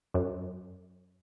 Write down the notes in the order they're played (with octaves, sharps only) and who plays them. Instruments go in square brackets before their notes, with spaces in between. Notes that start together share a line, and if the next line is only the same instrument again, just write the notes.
[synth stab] F#2